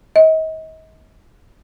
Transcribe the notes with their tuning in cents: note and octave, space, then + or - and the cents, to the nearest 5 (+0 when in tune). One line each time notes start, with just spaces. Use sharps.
D#5 +35